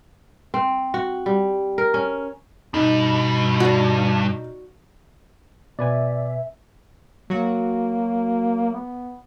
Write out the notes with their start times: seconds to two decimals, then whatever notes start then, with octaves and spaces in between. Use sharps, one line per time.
0.54 C4
0.94 F#4
1.26 G3
1.78 A#4
1.94 C#4
2.74 G2 B2 D#4
3.60 F#4 D5
5.79 B2 B4 D5 E5 G#5
7.30 F#3 A#3 F#4
8.73 B3